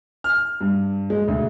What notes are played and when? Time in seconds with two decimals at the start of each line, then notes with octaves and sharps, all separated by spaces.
0.24 F6
0.61 G2
1.10 G#3
1.28 D2